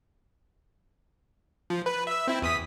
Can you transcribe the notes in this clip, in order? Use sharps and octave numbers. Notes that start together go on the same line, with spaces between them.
F3
B4
E5 E6
C4 E4
E2 D#6 B6